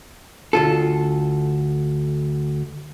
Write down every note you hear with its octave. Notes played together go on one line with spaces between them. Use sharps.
D2 F4 A4